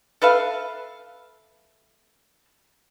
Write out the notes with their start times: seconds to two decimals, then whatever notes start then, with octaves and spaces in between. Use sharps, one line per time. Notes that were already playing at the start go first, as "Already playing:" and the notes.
0.22 A4 B4 E5 F5